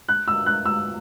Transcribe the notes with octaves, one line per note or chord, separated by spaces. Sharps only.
F#6
E6
F#6
E6